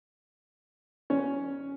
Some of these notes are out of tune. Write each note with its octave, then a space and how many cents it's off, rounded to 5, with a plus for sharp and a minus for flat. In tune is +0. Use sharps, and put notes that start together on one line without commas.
C#4 +5